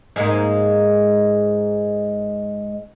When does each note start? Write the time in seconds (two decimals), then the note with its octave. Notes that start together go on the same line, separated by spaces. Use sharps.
0.16 G#2 G#3 A#3